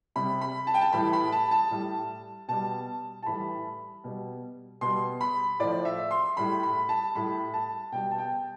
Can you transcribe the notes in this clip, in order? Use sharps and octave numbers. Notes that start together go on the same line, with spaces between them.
C3 G3 B5
B5
A5
G5
A5
A2 E3 G3 B5
B5
A5
A5
A2 G3
B2 G3 A5
A5
A2 E3 G3 B5
B2 G3
B2 G3 C6
B5
A2 F3 D5
E5
C6
A2 G3 B5
B5
A5
A2 G3 B5
A5
B2 G3 G5
A5
G5